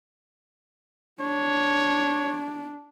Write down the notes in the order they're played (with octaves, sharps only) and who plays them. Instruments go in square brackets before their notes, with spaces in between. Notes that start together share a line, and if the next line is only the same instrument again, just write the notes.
[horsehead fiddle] D4 [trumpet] C#5